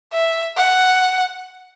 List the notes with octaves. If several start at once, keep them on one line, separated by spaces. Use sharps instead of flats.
E5
F#5